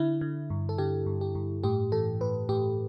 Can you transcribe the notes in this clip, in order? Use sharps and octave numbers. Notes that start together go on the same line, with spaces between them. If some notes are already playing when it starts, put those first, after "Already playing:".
Already playing: D3 E4
D3
G2
A4
D3 G4
G2
G4
G2
A2 G4
E3 A4
A2 B4
A2 G4